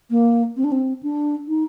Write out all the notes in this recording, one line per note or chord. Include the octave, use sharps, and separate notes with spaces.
A#3
C4
D4
C4
D4
D#4